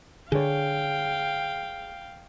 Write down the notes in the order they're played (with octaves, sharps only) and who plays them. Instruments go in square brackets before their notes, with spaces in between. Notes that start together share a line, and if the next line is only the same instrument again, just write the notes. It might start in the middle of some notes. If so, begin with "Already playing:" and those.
[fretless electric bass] D3 [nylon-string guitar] G#4 C#5 [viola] F5 G5